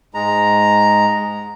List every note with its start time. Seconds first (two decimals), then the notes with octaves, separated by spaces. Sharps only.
0.14 G#2 G#3 A#5